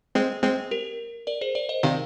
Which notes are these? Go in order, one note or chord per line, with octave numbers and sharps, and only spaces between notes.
G#3 C4
G#3 C4
G4 A#4
A#4 D5
G#4 C5
A#4 D5
C5 D#5
C3 D#3 D5 F5